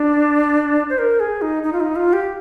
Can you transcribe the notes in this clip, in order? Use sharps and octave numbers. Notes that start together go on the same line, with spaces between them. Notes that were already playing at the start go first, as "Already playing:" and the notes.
Already playing: D4
C5
A#4
G#4
D#4
D#4
F4
D#4
F4
G4